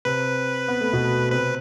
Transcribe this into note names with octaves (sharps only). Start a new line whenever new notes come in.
C3 C4 B4
B3
A3
B2 B3
C3 C4 B4